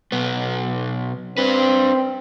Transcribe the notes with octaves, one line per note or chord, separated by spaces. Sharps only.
B1 B3
C4 D4 B4